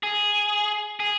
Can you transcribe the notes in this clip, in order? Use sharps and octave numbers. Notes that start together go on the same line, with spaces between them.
G#4
G#4